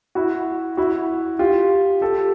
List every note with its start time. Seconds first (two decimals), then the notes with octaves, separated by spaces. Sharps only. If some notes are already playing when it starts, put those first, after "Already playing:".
0.15 E4 F#4
0.77 E4 F#4
1.39 F4 G4
2.01 G4 A4